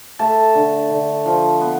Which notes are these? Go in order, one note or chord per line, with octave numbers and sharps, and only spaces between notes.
A3 A5
D3
D3
F3
B3